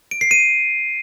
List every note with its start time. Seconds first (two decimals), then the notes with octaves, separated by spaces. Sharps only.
0.11 D7
0.21 C7
0.31 D#7